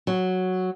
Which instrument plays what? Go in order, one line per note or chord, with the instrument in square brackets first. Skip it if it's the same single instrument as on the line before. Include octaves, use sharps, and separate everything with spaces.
[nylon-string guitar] F#3